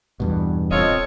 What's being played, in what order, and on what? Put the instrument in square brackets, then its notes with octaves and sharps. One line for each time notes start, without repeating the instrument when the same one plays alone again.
[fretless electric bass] E2 G2 B2
[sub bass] D#1 [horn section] C4 F4 D#5 [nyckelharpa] A4 C#5